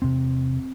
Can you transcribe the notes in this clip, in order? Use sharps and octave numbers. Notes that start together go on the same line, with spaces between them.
E2 C3 C4